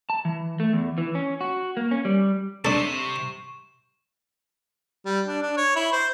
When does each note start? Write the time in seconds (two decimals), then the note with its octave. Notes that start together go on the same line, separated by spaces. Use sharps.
0.10 A5
0.25 E3
0.60 A3
0.73 E2
0.98 E3
1.15 C#4
1.41 F#4
1.77 A#3
1.91 C#4
2.05 G3
2.65 C3 D4 A4 C#6 E7
5.05 G3
5.27 D4
5.42 D4
5.56 C#5
5.76 E4
5.92 C5